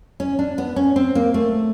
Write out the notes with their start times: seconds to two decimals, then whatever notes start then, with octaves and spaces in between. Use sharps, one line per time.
0.20 C#4
0.39 D4
0.58 B3
0.76 C#4
0.96 C4
1.15 A#3
1.34 A3